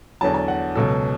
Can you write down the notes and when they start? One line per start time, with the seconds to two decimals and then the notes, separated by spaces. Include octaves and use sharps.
0.21 E2 D3 F#3 A5
0.34 A5
0.48 F#5
0.75 C#2 B2 F#3 A4